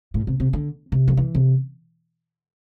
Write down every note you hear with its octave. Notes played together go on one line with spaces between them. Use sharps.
A2
C3
C3
D3
C3
F3
E3
C3